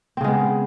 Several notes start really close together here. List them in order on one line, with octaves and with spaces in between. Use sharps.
C4 C#3 G#3 B3